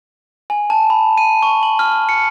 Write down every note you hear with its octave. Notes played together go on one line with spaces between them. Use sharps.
G#5
A5
B5
D#7
C#6
F#7
F6
C#7